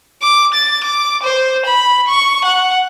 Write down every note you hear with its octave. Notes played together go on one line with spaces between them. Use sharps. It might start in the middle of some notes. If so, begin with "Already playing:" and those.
D6
A6
D6
C5
B5
C#6
F#5